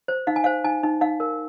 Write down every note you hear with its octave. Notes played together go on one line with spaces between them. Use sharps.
C5
D#4 F5
G#5
C5 F5
D#4 G#5
D#4
D#4 F5
A#4